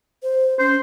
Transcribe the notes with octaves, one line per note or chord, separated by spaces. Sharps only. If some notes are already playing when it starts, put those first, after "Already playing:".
C5
C#4 C5